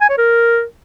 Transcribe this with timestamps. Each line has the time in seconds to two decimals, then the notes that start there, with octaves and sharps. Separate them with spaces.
0.01 G#5
0.10 C#5
0.18 A#4